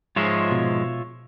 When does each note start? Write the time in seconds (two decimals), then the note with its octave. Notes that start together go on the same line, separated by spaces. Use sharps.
0.16 G#2 F3 G#3 F4 C#5 E5
0.51 B2